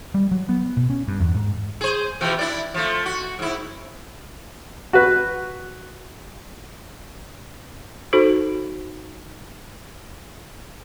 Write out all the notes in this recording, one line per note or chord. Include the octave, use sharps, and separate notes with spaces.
G3
F#3
B3
B2
C#4
G2
E2
G#2
G#4 C5
B2 E3 F3
D4 E4 D5
F3 A3
F#4
G#2 E4
F#4 B4
D#4 F#4 A4 C5